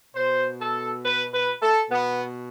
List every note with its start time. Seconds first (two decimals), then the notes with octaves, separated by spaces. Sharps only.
0.15 B2 C5
0.60 A4
1.04 B4
1.32 B4
1.62 A4
1.91 B2 B3